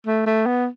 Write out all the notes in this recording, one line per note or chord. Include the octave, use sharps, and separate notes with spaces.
A3
A3
B3